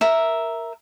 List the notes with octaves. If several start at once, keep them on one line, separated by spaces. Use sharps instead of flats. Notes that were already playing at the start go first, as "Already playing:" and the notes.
A#4 E5